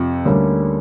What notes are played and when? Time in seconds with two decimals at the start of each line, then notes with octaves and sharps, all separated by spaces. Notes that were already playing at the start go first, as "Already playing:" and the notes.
Already playing: F2 C3
0.25 D2 D3 G3 A#3 C#4